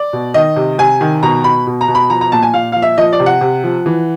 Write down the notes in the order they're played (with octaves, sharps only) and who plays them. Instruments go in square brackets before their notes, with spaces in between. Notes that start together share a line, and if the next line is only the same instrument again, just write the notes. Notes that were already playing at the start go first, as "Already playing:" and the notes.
Already playing: [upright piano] D5
B2
D#3 D#5
C3
C3 G#5
D#3
B2 A#5
B2 B5
B2
A#5
B2
B5
F3 A#5
A#5
A#2 A5
G#5
A#2 F5
F3 F5
E5
F3 D#5
D5
C3
F#5
C3
F3
E3